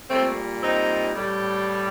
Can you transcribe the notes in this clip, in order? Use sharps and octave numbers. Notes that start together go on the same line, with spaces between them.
A#2 G3 A3 C4
C4 D#4
A2 G3